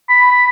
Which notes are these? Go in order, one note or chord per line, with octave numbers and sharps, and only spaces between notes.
B5